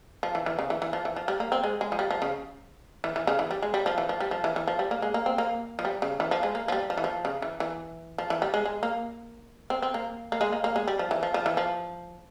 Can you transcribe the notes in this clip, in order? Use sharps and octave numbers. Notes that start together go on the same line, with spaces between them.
F3
E3
E3
C#3
E3
E3
F3
E3
F3
G3
A#3
C4
G#3
G#3
F3
G3
F3
C#3
E3
E3
C#3
E3
G3
G#3
G3
F3
E3
F3
G3
F3
E3
E3
F3
G3
A#3
G#3
A#3
C4
A#3
F3
G3
C#3
E3
F3
G#3
A#3
F3
G3
F3
E3
F3
C#3
E3
E3
F3
E3
G3
G#3
G#3
A#3
C4
C4
A#3
A#3
G#3
A#3
A#3
G#3
G3
F3
E3
F3
F3
E3
F3